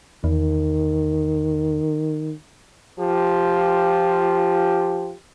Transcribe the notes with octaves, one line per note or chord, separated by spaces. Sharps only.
E2 D#3
F3 F4 G4